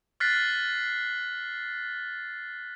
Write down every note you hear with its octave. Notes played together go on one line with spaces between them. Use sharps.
F6 F#6 A6 B6 C7